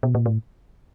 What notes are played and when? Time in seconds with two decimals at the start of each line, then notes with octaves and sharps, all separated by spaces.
0.03 B2
0.15 A#2
0.26 A2